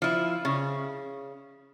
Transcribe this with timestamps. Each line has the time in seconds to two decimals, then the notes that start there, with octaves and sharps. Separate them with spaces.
0.02 F3 E4
0.45 C#3